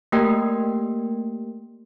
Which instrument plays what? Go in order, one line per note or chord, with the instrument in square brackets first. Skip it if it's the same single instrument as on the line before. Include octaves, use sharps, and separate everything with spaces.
[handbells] A3 A#3 G4 A#4 G5